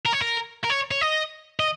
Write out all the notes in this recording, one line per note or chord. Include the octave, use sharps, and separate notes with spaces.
A#4
C#5
A#4
A#4
C#5
C#5
D#5
D#5